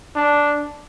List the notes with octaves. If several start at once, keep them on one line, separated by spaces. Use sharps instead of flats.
D4